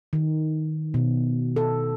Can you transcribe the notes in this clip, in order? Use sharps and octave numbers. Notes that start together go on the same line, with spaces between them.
D#3
B2
A4